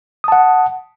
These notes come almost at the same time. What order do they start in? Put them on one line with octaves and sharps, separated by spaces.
D#6 A5 F#5